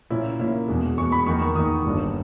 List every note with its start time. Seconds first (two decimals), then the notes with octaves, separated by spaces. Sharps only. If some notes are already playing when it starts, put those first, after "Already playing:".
0.10 A#2 A#3 C#4 E4
0.39 A#2 A#3 C#4 E4
0.68 E2 B2 G#3
0.97 E2 B2 G#3 C#6
1.12 B5
1.26 E2 D#3 A#3 D#4 C#6
1.41 C#6
1.56 E2 D#3 A#3 D#4 D#6
1.85 G1 G2 G3 A#3